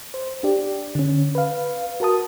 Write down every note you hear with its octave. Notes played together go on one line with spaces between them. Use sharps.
C5
D4 G4 D5
D3 C#4
B4 F5
F#4 A#4 A5 D#6